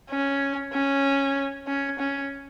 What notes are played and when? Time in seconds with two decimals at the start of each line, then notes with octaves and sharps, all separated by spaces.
0.11 C#4
0.73 C#4
1.67 C#4
1.99 C#4